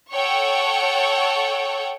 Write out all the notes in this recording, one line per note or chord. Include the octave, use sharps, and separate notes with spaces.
A4 C#5 F#5 G5 C#6